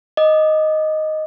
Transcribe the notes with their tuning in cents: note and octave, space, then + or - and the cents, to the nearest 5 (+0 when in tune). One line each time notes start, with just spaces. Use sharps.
D#5 +0 D6 +20